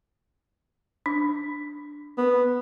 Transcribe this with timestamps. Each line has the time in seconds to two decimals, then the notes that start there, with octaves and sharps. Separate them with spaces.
1.06 D4
2.18 B3